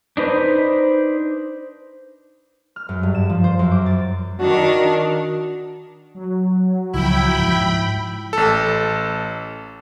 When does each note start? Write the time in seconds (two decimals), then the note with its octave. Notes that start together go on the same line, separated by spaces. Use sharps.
0.17 D4 D#4 B4 C5
2.76 F6
2.89 F#2
3.03 G2
3.15 E7
3.30 F3
3.44 C5
3.59 F#2
3.72 D6
3.86 A6
4.39 D#3 D4 F#4 A#4
6.15 F#3
6.94 C#2 F3 E4 G5 B5
7.37 G#2 F3
8.33 A1 A4